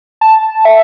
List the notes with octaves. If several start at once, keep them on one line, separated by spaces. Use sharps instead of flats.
A5
E5